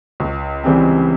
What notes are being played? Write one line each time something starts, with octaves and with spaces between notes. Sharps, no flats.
C#2
C#3 E3 G3 C4